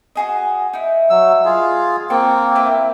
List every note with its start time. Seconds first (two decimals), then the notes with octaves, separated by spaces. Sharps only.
0.16 F#4 G#4 D#5
0.73 D#4 E4
1.10 F#3 E6
1.45 F4 G#4
2.10 A#3 C4 G5 A5 C#6
2.55 E4 B4 G5